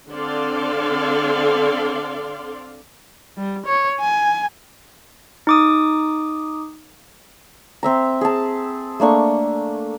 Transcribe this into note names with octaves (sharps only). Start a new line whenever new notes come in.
D3 C4 A4 D5 F5 C6
G3
C#5
G#5
D#4 D6 D#6
C4 E5 A#5
G#4 A5
A3 A#3 D4 C#6